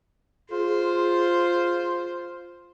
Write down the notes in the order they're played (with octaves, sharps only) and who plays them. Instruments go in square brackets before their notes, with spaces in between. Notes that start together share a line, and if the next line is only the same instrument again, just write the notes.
[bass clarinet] F4 [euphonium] G#4 [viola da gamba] C5